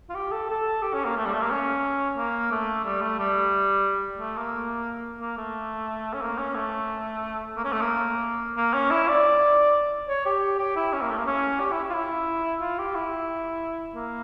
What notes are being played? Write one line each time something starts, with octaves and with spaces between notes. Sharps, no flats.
F4
G4
A4
A4
G4
C#4
A#3
A3
G3
A3
A#3
C#4
A#3
A3
G3
A3
G3
A3
A#3
A#3
A3
C#4
A#3
C#4
A3
A#3
C#4
A3
A#3
A#3
C#4
E4
D5
C#5
G4
G4
E4
C#4
A#3
A3
A#3
C#4
G4
E4
F4
E4
F4
G4
E4
A#3